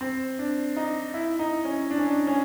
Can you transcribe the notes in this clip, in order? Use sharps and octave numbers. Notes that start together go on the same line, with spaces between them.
C4
D4
D#4
E4
D#4
C#4
D4
C#4
D4
C#4